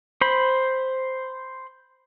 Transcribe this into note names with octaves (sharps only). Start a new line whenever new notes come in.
C5 B5